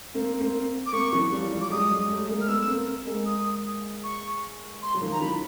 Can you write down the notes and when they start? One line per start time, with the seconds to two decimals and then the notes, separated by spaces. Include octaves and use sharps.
0.14 A#3 C4
0.41 A#3 C4
0.86 D6
0.92 A#3 C4 C#6
1.12 E3 F#3
1.32 F3 G3
1.51 F3 G3
1.61 D6
1.70 F#3 G#3 D#6
1.90 F#3 G#3
2.10 G3 A3
2.29 G#3 A#3
2.41 F6
2.48 A3 B3 E6
2.68 A#3 C4
3.06 G#3 A#3
3.26 D#6
4.04 C#6
4.82 C6
4.94 F#3
5.02 D#3 F3
5.12 A#5
5.20 E3 F#3 B5